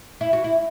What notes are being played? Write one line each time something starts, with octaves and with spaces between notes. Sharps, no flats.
E4
F#4
E4